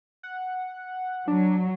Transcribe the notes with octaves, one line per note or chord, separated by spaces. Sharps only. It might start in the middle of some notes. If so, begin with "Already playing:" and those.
F#5
F#3 D4